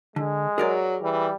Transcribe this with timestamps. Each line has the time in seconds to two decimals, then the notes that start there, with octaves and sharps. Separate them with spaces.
0.16 D3 G#3
0.58 F#3 G#4 A#4 D5
1.02 E3 G3